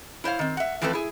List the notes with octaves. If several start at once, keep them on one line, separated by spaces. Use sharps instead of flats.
E4 C5 C#5 F5
D#3 C4
E5 F#5
E3 F3 A3 C4 A4 B4
E4 G#4